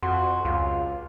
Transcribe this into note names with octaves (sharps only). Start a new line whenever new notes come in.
F2 F#4 C6
C#2 F4